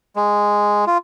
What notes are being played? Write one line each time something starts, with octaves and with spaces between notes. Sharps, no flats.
G#3
F4